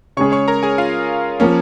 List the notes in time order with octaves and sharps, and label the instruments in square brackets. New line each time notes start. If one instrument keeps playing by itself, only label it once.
[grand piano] C#3 G#3 C#4 G#4 [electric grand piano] C#5 C#6
[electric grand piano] C#5 C#6
A#4 A#5
G#4 G#5
F4 F5
[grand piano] F3 A#3 [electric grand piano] C#4 C#5